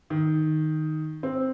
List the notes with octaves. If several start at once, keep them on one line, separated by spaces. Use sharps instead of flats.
D#3
C4